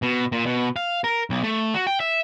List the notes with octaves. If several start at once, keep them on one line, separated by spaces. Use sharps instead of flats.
B2
A#2
B2
F5
A#4
B1
A3
F#4
G5
E5